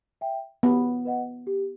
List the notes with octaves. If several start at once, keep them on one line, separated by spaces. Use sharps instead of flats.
E5 G5
B3 G4
B4 D#5 F#5
G4